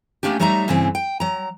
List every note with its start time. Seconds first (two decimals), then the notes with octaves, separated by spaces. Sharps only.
0.23 A3 A#3 C#4 D4 G4
0.40 F#3 G3 A3 D#4 E5 A#5
0.68 G2 C#3 E3 C4
0.95 G5
1.20 F#3 A#5